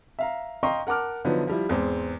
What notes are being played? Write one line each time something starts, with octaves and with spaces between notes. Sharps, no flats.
E5 F5 A#5
D#5 F5 G5 A#5 C6 C#6
A#4 F#5 A5 D6 F6
D3 F3 F#3 B3 D#4
F3 G3 E4
E2 G#2 C4